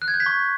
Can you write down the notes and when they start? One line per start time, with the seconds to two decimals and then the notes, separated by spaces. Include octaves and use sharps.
0.02 F#6
0.08 G#6
0.14 G6
0.20 B6
0.26 C#6